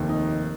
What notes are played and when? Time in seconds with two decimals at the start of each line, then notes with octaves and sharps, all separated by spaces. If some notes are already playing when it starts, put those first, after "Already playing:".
Already playing: F1 D#2 D#3
0.09 D#4